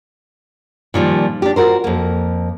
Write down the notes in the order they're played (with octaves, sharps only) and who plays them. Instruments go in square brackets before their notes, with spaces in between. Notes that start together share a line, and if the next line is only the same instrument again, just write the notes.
[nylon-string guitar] A#2 D#3 F3 G3
D4 G4
F4 F#4 A#4 C5
F2 A#3